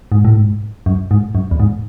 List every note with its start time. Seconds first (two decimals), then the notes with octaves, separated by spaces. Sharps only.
0.12 G#2
0.25 A2
0.37 G#2
0.86 F#2
1.11 G#2
1.35 F#2
1.51 E2
1.60 G#2